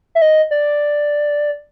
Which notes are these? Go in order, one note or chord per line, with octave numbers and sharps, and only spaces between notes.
E5
D#5
D5